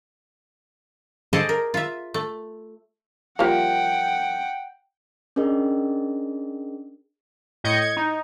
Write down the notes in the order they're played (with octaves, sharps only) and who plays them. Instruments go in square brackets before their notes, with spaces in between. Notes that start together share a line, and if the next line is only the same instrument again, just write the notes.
[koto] G#4 A4 C5 D5 D#5 A5
A#4
F4 E5
A3
[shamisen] F3 G3 A#3 [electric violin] F#5 G5
[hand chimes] C#4 D4 G#4 A#4 D#5
[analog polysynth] A2 D#5 G6 G#6 C#7
G#6
D#4